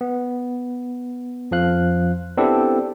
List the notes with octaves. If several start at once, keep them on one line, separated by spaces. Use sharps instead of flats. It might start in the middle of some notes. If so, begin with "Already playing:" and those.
B3
F2 F3 F5 F#6
B3 C4 D4 E4 G4 A4